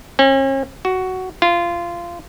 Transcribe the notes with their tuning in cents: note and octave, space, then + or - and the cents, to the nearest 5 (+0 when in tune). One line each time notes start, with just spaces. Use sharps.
C#4 -40
F#4 +10
F4 -20